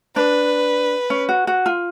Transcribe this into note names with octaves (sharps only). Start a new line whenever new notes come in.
D4 B4
C#4
F#4
F#4
F4